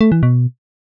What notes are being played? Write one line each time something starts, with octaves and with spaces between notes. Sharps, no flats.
A3
E3
B2